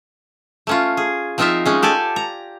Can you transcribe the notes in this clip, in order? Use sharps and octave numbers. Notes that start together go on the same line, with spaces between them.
A3 C#4 F4
G#4
F3 C4 D#4 F4 A#4 E5
G#3 C#4 D#4
G4 A4 D5 G#5
A#5